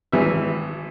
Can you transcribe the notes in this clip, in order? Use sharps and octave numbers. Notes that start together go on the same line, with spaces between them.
G#1 E3 E5